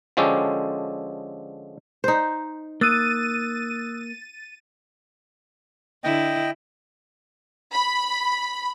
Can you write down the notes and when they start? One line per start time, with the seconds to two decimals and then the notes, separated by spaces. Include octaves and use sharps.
0.17 D3 F3 G#3 C#4 G4 A4
2.04 D#4 C5
2.81 A#3 D#6 E6 F#6 A6 D#7
6.04 D3 E4 D#5 G5
7.73 B5